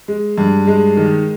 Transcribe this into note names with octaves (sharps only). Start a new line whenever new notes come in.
G#3
G2
G#3
D#3